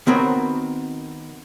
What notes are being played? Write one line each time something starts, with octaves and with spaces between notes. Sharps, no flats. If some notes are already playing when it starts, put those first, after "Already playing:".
D#3 B3 C4 F#4 A#4 C#5